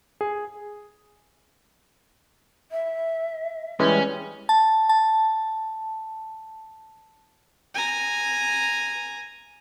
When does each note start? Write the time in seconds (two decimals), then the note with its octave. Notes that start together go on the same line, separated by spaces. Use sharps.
0.21 G#4
2.71 E5
3.79 E3 G3 G#3 C#4 B4
4.49 A5
4.89 A5
7.74 G#5 A#5